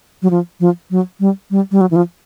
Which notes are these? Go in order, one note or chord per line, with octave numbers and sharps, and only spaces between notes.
F#3
F3
F3
F#3
G3
G3
G3
F#3
E3
F3